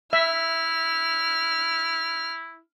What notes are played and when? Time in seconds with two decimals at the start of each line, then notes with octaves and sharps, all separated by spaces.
0.13 E4 E5 F6